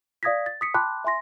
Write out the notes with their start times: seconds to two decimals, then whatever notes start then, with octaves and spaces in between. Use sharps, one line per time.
0.23 D5 F5 D#6 G#6 A#6 B6
0.46 A6
0.61 D#6 B6 C#7
0.74 G5 A5 B5 C6 D6 F#6
1.04 E5 G#5 C6 A#6